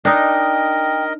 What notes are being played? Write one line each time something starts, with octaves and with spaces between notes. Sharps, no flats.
D4 D#4 A#4 D#5 G5